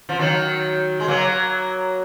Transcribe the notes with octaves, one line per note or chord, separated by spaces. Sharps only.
F3
D#3 F#3
G#3
F#3 A#3